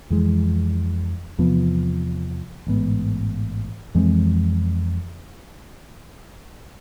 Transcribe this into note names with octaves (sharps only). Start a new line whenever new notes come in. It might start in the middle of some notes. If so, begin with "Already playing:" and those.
F2 E3 G#3
E2 C3 F3 B3
A1 G#2 G#3 B3
F2 E3 G#3 C4